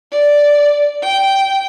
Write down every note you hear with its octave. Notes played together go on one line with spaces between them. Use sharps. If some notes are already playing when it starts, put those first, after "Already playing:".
D5
G5